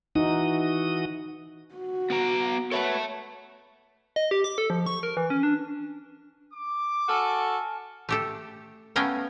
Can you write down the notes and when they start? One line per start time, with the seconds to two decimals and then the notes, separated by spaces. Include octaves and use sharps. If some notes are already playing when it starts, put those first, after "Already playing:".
0.16 E3 D#4 F#4 D#6
1.75 F#4
2.10 B3 B4 A#5
2.72 F#4 A4 B4 C#5 E5 A5
4.16 D#5
4.31 G4
4.44 D6
4.58 A4
4.70 F3
4.86 C#6
5.03 A#4
5.17 E3
5.30 C#4
5.43 D4
6.53 D6
7.09 F#4 A4 G#5 A5 F6
8.09 A3 G4 A4
8.96 A3 B3 C#4 A#4 F5 G5